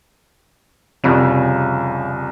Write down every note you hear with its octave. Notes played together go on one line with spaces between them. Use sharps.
C2 F2 C#3